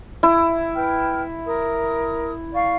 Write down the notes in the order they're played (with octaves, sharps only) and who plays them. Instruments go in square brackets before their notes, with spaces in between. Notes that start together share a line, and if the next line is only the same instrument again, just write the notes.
[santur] E4
[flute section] B4 G5 F6
A#4 D#6
D5 F5 C#6